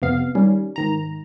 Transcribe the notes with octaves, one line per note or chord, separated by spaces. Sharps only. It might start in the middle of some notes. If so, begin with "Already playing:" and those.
F2 C3 B3 F5
D#3 G3 C#4
G#2 D#3 A#5